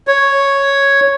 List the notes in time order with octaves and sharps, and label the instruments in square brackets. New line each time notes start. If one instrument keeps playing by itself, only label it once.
[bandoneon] C#5